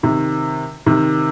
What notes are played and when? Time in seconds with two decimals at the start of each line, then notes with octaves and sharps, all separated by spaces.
0.03 C3 D#3
0.86 C3 D#3